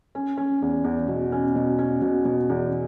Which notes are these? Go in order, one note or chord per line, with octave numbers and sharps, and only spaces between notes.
C#4
C#4
E2
E2
B2
C#4
B2
C#4
B2
B2
E2